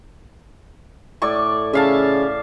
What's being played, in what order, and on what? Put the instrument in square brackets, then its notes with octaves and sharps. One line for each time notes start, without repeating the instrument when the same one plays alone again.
[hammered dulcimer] A2 D5 C#6
[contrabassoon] C#3 [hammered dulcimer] E5 F5 A5